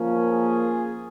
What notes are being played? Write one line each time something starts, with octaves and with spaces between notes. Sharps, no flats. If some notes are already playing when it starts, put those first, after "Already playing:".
Already playing: F3 A#3 C#4
F4 G#4